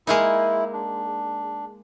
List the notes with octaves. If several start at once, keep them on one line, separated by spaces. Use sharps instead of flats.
G#3 A#3 D#4 E4
D4